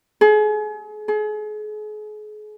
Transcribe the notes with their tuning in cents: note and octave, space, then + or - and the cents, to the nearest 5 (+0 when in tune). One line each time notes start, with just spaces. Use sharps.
G#4 +35
G#4 +40